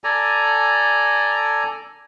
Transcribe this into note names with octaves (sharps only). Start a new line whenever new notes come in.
A4 D5 G#5 A#5